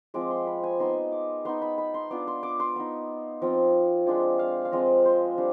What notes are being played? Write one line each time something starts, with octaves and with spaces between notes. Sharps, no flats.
F3 G#3 C4 D6
C6
B5
G#5
B3 D#4 C6
D6
B3 D#4 C6
B5
B5
C6
B3 D4 F4 D6
C6
D6
C6
B3 D#4
F3 C4 F4
F3 G#3 D4 F4 G5
F5
F5
F3 G#3 C4 F4 D#5
C5
G3 D4